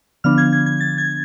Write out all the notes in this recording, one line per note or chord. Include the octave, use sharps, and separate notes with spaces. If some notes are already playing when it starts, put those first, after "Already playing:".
D3 F3 B3 D4 F6
G#6
G#6
G#6
A6
G#6